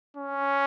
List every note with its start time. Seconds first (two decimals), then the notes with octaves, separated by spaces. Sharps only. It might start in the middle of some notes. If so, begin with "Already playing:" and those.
0.17 C#4